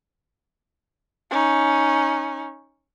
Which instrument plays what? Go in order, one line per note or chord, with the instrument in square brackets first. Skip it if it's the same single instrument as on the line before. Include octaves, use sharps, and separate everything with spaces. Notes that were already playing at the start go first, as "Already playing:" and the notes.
[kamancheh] C#4 D#4